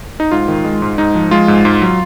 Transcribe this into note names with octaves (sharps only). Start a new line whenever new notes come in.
D#4
G#2 F4
D#3
G#3
G#2
G#2 D#4
F3
G#3 F4
G#2
G#2
F#3